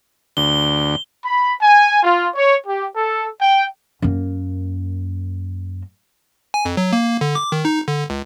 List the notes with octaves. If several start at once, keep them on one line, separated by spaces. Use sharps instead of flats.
D2 G7
B5
G#5
F4
C#5
G4
A4
G5
F#2 A#3
G#5
F2
F#3
A#3
D3
D6
D#3
D#4
D3
C#2